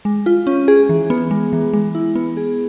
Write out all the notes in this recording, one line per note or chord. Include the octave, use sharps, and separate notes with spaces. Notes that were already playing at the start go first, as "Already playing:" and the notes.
G#3
F4
C#4
G#4
E3
B3
G#3
E3
G#3
E4
B3
G#4